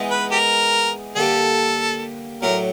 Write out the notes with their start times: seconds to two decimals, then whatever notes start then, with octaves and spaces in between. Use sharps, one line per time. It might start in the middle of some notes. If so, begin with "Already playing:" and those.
Already playing: E3 G#3 B3 D#4
0.11 B4
0.31 G4 A#4
1.15 D3 G3 A#3 D4 G4 A4
2.42 A2 F#3 A3 D4 A#4